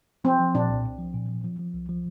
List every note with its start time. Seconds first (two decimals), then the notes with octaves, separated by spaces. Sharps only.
0.24 F3 C4
0.39 F3
0.55 A#2 D4
0.69 C2
0.84 C2
0.99 F3
1.14 A#2
1.29 F3
1.44 F3
1.59 F3
1.73 C2
1.89 F3